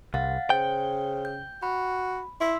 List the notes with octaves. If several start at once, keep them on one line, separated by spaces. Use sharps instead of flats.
C2 F5 F#5 A6
C#3 C5 G5
G6
F#4 B5
E4 C6 E6 B6